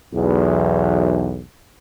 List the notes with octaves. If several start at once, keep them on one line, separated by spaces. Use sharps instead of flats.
B1 E2